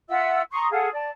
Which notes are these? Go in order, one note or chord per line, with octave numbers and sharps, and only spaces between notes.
F4 E5 F#5 E6
A#5 C6 C#6 D#6
F4 G#4 A4 F#5
D5 A5